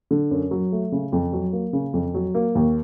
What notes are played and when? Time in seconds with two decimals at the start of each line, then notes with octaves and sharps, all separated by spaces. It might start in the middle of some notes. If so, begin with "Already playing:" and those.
0.11 D3
0.31 F#2
0.51 F#3
0.72 A3
0.92 C#3
1.12 F2
1.33 F#3
1.53 A#3
1.73 C#3
1.94 F2
2.14 F#3
2.35 A#3
2.55 D#2